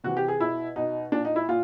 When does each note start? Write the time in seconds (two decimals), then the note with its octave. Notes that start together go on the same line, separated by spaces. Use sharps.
0.04 C3 E3 F#4
0.17 G4
0.28 G#4
0.40 B2 E4
0.76 B2 D#4
1.12 A#2 D4
1.25 D#4
1.36 E4
1.49 A#2 F4